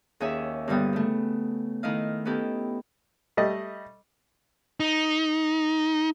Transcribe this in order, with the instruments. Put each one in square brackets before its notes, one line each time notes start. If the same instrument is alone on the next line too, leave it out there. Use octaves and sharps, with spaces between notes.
[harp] D#2 C#4 G#4 C#5 E5
G2 A#2 D3 G3 B3 D#6
C#3 A3
D#3 A3 D#4 E4 D#5 F5
B3 C#4 D#4 E4 G4 A4
[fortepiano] G3 A3 D#5
[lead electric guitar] D#4